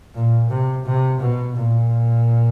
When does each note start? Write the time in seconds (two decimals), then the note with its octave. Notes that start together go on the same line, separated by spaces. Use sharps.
0.14 A#2
0.50 C3
0.86 C3
1.20 B2
1.56 A#2